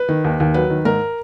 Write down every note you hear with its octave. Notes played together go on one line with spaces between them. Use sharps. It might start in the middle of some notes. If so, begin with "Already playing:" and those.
Already playing: B4
D#3
D#2
D#2
F#3 B4
D#3
G#2 A#4